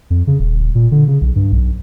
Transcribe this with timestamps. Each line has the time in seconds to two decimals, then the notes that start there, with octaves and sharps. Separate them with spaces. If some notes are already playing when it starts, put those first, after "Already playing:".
0.10 F2
0.27 C#3
0.39 D#1
0.60 D#1
0.75 A#2
0.91 D3
1.08 C#3
1.21 B1
1.36 G2
1.52 B1